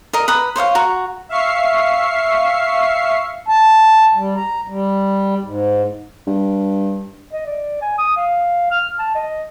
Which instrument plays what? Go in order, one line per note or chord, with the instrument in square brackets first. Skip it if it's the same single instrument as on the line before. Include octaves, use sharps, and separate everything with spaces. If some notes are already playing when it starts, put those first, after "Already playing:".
[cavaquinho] A#4 D#5
B4 A#5 D#6
C5 C#5 D#5 F5
F#4 A#5 C#6
[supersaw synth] E5 F5 C#6 C7
[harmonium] A5
G3
A#5
G3
G#2
[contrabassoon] G2
[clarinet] D#5
D5
G#5
D#6
F5
F6
A5
D#5